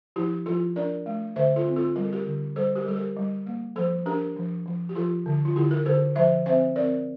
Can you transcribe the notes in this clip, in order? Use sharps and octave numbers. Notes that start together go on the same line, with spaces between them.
F3 E4 G4
F3 F4 A4
D4 A#4 D5
A3
D3 C5 E5
F4 A4
C4
F4 A4
G3 A#4
A4
G4 A#4
D3
G3 A4 C5
G4 A#4
G3 A4
G4 A#4
G3
A#3
F3 A4 C5
D4 G4 A#4
F3
F3
G4
F3 F4 A4
D3
F4
D3 E4 G4
G4 A#4
D3 A4 C5
F3 C5 E5
C4 C5 E5
C4 A#4 D5